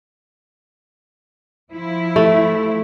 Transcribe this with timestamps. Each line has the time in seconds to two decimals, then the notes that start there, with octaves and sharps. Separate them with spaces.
1.71 F3 E4
2.16 A3